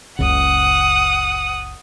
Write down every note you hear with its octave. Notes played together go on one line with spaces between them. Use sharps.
F#1 C#2 C#3 F#5 D#6